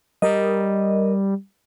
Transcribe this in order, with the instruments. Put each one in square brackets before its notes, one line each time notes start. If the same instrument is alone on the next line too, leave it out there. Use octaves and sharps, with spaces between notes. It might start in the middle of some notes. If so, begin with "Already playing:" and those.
[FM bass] G3 [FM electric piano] A#4 D#5